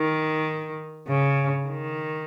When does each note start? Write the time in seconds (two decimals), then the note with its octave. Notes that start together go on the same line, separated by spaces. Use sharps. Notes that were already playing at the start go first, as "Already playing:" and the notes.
Already playing: D#3
1.08 C#3
1.67 D#3